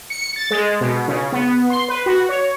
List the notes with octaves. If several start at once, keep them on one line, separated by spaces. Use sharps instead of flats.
C#7
A6
G#3
B2
C#3
B3
C6
B4
F#4
C#5